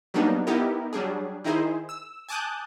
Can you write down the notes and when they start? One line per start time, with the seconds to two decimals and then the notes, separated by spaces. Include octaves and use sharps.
0.14 F#3 G3 A#3 B3 D4 D#4
0.47 B3 D#4 E4 G4 A#4
0.93 F#3 G3 D4 G#4
1.44 D#3 D#4 E4 G#4 C5
1.89 E6
2.29 G#5 A5 D6 D#6 F#6 G6